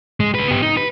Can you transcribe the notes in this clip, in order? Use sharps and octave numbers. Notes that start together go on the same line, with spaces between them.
G#3
C#2 B4
B3 G4
D#4
B4